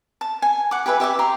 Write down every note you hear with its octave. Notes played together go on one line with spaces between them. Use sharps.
A5
G#5
F#5 D6
G4 G#4 B4 E5
G4 E5 G5 D6
G4 A#5 C6